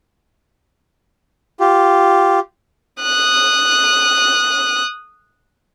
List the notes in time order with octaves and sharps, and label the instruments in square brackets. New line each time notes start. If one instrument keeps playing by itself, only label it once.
[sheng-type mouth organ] F4 G4
[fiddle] D#6 F#6